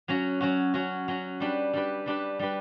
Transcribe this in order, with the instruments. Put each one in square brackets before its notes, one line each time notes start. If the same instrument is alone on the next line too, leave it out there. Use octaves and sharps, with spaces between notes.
[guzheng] F#3 C#4 F#4
F#3 C#4 F#4
F#3 C#4 F#4
F#3 C#4 F#4
G3 D4 G4 B4
G3 D4 G4 B4
G3 D4 G4 B4
G3 D4 G4 B4